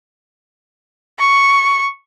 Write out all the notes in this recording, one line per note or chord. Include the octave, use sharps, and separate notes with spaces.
C#6